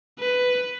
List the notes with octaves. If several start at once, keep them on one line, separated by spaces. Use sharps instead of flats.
B4